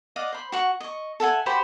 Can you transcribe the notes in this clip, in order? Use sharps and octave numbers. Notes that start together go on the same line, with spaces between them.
D5 D#5 F5 F#5
C5 B5
F#4 F#5 C#6
D#5 C#6
A4 E5 F#5 G#5
F#4 G4 C5 B5